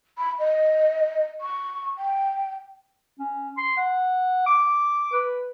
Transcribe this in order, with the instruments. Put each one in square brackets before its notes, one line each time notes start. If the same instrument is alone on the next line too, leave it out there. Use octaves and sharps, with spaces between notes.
[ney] B5
D#5
C#6
G5
[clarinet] C#4
C6
F#5
D6
B4